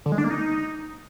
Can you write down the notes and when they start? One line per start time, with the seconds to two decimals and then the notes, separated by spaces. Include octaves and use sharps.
0.06 D3
0.12 G#3
0.18 D4
0.24 A#3
0.30 D#4